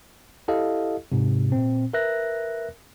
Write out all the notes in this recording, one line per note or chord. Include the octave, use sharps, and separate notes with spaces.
E4 G4 A4 D#5 F5
G#2 C3
A#2 C4
A#4 B4 E5 F#6 A#6